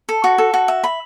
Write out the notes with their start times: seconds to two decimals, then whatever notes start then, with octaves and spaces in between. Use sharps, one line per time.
0.09 A4
0.24 F#4
0.38 A4
0.54 F#4
0.68 E5
0.84 B5